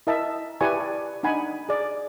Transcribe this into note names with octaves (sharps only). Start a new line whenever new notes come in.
E4 A#4 D#5 E5 A5
E4 G4 B4 D5 G#5 C#6
D5 A5
D4 D#4 F#5 G#5 B5
G#4 D5